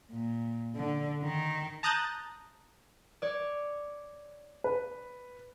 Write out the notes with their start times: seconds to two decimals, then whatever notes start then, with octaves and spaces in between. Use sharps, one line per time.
0.11 A#2
0.76 D3
1.23 D#3
1.83 A5 A#5 D#6 F#6 G6 A6
3.22 C#5 D5
4.64 B4